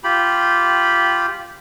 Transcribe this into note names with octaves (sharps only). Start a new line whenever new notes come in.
F4 G4 G5 B5